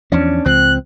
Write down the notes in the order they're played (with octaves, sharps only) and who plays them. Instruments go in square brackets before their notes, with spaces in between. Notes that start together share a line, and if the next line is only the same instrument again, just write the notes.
[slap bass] E2 F3 [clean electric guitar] C#4 D4
[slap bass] C#2 F3 [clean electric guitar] C4 [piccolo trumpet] F#6